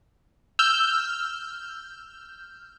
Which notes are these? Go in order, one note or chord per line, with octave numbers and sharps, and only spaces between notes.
E6 F6 G6